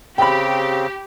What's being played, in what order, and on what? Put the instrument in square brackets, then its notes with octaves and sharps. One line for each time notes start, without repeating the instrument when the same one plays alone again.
[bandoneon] C#3 C4 [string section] G4 [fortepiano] G5 B5